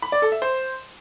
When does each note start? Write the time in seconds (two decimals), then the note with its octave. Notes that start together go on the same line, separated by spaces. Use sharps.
0.02 B5
0.12 D5
0.22 A4
0.32 E5
0.42 C5